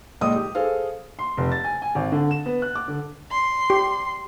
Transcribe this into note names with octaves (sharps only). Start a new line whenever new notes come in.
C#2 A#2 D#5 D#6
G4
G#4 A4 C5 F5
C6
F1
A6
G#5
G#5
G#1
D3
E7
B3
F#6
D6
D3
C6
G4